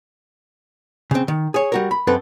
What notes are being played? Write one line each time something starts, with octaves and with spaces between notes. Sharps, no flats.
C#3 C4
D#3
G#4 C#5
G3 F#4 A#4
B5
F#2 C4 A4 B4